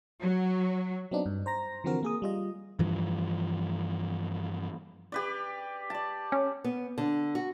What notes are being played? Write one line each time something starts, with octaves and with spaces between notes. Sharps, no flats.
F#3
F#3 B3 C4 D4 D#4
G2
C5 A#5 A#6
D3 E3 F3 C4 F#4 A#4
A#3 G#4 D#6
G3 F4 D#5
G2 E3 F3
G4 B4 D5
D5 A5
C#4
B3
D3
F#4